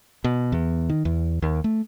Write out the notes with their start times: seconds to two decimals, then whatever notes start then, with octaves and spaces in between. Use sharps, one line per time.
0.24 B2
0.52 E2
0.89 D#3
1.05 E2
1.42 D#2
1.64 A3